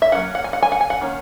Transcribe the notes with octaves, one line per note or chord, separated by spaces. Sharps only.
E5
F#3 A#3 C#4 F#5
F#5
G#5
F#5
G#5
F#5
G#5
F#5
D#3 A#3 C#4